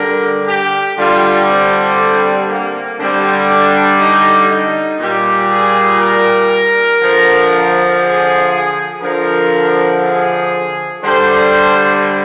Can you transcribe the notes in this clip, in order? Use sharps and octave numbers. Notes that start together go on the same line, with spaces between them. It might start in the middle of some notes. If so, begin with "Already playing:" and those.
Already playing: D3 G3 A#4
G4
D3 G3 F4
C4
A#3
D3 G3 C4
D4
D#4
D#4
A#2 G3 G4
G#4
A#4
D3 F3
G#4
D3 F3 A#4
G#4
D3 G3 C5